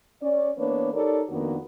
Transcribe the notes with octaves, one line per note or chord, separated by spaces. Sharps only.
C#4 D5
E3 A#3 B3 D4 B4 C#5
D#4 G4 A4 A#4 C#5 D5
F2 D#3 A#3 B3 D4 F#4